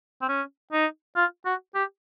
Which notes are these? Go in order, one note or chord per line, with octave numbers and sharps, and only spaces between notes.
C4
C#4
D#4
F4
F#4
G4